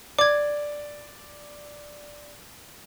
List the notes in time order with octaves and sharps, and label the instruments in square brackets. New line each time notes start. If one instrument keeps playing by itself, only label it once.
[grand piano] D5 [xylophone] D6 G#6